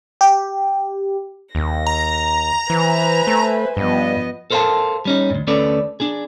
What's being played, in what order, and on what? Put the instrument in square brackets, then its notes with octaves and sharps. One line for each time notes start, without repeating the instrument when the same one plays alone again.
[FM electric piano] G4
[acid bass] D#2 [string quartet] A#6
[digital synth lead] A#5
[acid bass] E3 [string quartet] B4 C5 G#5
[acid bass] A3
[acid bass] G2 [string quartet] F3 B3 D#5
[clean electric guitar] A4 A#4 C5 D5 F5 A5
G3 C#4 D#4
D2 G2
D2 A3 C#4 A4 B4 D5
D4 G#4